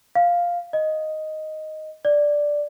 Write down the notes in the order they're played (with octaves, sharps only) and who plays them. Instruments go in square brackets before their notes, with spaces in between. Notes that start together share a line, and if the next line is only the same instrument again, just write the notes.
[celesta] F5
D#5
D5